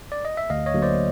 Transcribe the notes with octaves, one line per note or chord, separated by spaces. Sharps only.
D5
D#5
E5
D2 D#5 F5
C#5 D#5
D3 F#3 A#3
C5 D5